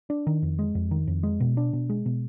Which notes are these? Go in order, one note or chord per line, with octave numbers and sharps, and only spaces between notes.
D4
D#3
F2
G#3
F2
D#3
F2
G#3
B2
D4
B2
G#3
B2